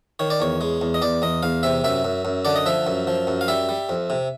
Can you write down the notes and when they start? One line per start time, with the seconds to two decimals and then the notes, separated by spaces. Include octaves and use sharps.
0.19 D#3 C#5
0.30 D5
0.40 E2 C#5
0.61 G#3
0.81 E2
0.94 D#5
1.02 E2 D5
1.22 E2 D#5
1.43 E2 F5
1.63 C3 E5
1.84 F#2 E5
2.04 F#2
2.25 F#2
2.45 D3 D5
2.56 D#5
2.66 F3 E5
2.87 F#2
3.07 F3
3.27 F#2
3.41 F5
3.48 G3 E5
3.69 G3
3.89 F2
4.10 C3